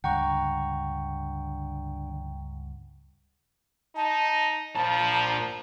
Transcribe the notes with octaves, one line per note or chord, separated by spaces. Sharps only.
C#2 G2 D3 F#5 G5 A#5 C#6
D#4 A5
A#2 F3 A5 A#5